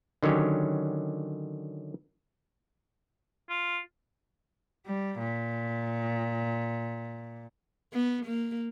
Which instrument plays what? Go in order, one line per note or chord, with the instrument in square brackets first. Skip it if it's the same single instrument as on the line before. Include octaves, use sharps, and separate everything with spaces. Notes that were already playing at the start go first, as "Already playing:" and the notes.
[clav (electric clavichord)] D3 D#3 F#3 C#4 G4
[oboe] F4
[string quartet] G3
A#2
[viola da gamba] B3
A#3